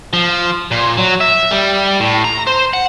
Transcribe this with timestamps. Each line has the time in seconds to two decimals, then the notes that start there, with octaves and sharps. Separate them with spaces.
0.13 F3
0.71 A#2
0.97 F#3
1.21 E5
1.51 G3
2.00 A2
2.24 A#5
2.47 C5
2.73 F#5